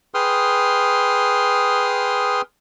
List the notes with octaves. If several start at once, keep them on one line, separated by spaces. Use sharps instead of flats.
G#4 B4 G5 C6 D#6 F6